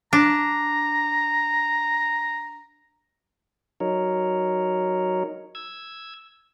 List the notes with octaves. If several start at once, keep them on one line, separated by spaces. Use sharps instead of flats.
D4 A#5
F#3 D#4 A#4 C#5
E6 G#6